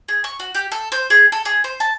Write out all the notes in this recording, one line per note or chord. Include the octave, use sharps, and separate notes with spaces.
G#4
C#6
F#4
G4
A4
C5
G#4
A4
G#4
C5
A5